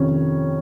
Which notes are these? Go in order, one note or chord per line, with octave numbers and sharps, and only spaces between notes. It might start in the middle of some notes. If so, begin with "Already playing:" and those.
Already playing: F2 C3 D#3 C#4